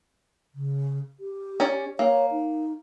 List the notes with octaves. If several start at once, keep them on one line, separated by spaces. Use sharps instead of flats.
C#3
G4
C#4 C#5 D5
A#3 C#5
D#4